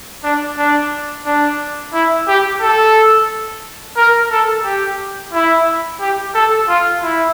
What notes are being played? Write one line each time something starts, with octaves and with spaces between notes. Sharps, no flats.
D4
D4
D4
E4
G4
A4
A#4
A4
G4
E4
G4
A4
F4
E4